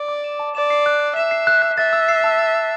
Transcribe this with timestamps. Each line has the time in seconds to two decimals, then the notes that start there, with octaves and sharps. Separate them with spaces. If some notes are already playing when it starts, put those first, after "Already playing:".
Already playing: D5
0.09 D6
0.24 E7
0.39 A5
0.55 D5 E7
0.70 C7
0.86 F#6
1.00 F#6
1.16 E5 E7
1.31 C7
1.47 F#6
1.62 F#6
1.78 E5 A6
1.93 E6
2.08 C7
2.24 A5
2.39 A6
2.54 E6